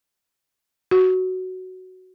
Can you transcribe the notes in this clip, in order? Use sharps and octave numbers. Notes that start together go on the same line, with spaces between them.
F#4